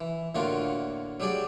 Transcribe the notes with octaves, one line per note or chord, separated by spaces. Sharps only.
E3
A2 D3 A#3 F4 F#4
F#3 G3 G4 G#4 D5